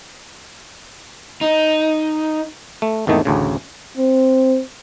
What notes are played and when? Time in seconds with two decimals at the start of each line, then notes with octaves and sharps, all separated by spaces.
1.41 D#4
2.82 A3
3.07 G#1 E2 D#3 A3 D#4
3.25 A1 D2 C#3
3.98 C4